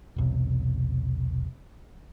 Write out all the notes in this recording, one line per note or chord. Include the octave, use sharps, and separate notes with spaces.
E1 B1 C3